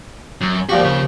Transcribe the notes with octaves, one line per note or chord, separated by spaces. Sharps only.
F#2
D#2 F3 F#4 G4 D5
C#3